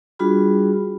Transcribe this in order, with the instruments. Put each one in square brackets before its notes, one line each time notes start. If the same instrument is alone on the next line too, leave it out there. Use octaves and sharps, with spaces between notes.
[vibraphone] G3 D4 F4 F#4 G#4 B5